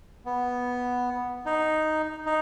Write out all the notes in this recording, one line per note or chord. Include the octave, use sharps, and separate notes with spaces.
B3
D#4
D#4